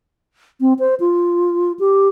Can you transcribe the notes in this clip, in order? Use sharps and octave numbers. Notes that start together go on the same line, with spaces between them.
C4
C5
F4
G4